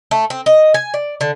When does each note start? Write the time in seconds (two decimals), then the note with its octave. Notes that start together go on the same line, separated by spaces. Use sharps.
0.11 A3
0.30 C4
0.46 D#5
0.74 G#5
0.94 D5
1.21 D3